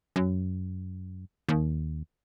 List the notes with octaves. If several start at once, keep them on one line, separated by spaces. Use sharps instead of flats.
F#2
D#2